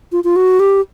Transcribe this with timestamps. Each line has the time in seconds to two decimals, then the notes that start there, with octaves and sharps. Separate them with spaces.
0.12 F4
0.24 F4
0.36 F#4
0.60 G4